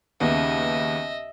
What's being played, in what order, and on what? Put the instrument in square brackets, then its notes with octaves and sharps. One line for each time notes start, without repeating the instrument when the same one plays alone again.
[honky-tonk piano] D#2 C#3 B3 [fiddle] D#5 E5